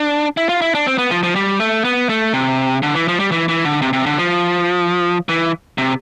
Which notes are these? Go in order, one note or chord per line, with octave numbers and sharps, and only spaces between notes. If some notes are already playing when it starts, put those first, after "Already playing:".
Already playing: D4
E4
F4
E4
D4
C4
B3
F3
F3
G3
A3
B3
A3
C3
D3
E3
F3
G3
E3
E3
D3
C3
C3
D3
F3
E3
C3